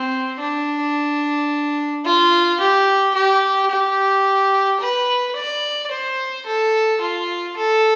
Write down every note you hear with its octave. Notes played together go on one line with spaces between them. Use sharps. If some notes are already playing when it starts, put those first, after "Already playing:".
Already playing: C4
D4
F4
G4
G4
G4
B4
D5
C5
A4
F4
A4